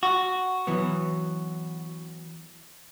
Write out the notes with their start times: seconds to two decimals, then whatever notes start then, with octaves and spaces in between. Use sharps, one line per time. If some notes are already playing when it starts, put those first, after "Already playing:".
0.03 F#4
0.67 E3 F#3 B3